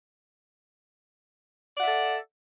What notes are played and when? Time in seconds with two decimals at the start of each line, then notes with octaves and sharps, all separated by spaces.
1.77 D5
1.80 F#5
1.83 E5
1.86 A4